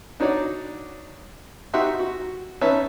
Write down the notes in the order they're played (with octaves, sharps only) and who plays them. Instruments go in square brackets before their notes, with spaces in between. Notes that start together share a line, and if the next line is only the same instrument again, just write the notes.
[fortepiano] D4 D#4 F#4 C#5 D5
D#4 F#4 G4 E5 F#5 C6
F#4
C#4 D#4 B4 C#5 E5 A5